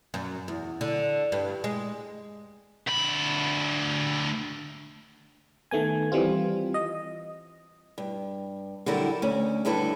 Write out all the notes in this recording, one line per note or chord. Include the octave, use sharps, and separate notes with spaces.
F#2
E2
D3
G2
G#3
D2 B5
D#3 A3 B3 G#5
E3 G3 C4 F4
D#5
G2
D3 F#3 G3 E4 A4 A#4
D2 C#4
D2 G2 D3 E4 A4 B4